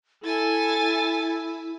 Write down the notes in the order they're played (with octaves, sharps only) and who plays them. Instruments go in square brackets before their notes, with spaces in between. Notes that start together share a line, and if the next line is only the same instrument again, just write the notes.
[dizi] E4 [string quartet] A4 G#5 A6